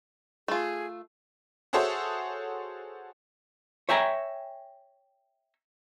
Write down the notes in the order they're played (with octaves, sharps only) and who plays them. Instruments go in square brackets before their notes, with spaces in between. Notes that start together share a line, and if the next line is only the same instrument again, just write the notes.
[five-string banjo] A3 F4 [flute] G#4
[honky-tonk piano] F#4 G#4 A4 C5 C#5 E5
[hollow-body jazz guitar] C#5 E5 G5 G#5 A#5